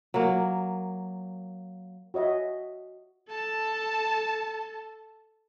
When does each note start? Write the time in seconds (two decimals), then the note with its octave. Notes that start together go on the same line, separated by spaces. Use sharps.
0.14 F#3 A#3
2.14 F#4 C#5 D#5 E5
3.28 A4 A5